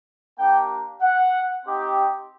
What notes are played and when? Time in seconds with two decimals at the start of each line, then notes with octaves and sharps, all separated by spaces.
0.39 A#3 D4 G4 G5
1.02 F#5
1.65 C4 D#4 G4